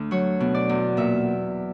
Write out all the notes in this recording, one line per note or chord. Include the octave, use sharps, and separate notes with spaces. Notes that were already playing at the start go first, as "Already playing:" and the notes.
Already playing: D2
F#3 C#5
B2
D5
E2
A#2 E5